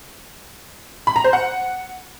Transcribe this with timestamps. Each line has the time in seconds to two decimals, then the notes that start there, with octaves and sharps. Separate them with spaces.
1.07 B5
1.16 A#5
1.24 C5
1.33 F#5